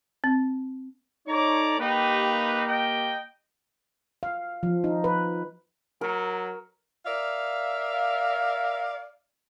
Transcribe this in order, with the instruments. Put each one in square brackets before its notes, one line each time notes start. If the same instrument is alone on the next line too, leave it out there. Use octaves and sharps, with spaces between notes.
[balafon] C4
[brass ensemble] D#4 A4 C#5 [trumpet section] D5 A#5 D6
[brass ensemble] A#3 G4 [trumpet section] D#4 B4
[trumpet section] D#5 G5
[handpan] F5
F3
D#4
B4
[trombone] F#3 [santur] A#4
[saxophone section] A#4 D5 E5 F5